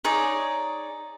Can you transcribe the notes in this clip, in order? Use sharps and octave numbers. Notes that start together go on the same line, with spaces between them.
D#4 G#4 C#5 D5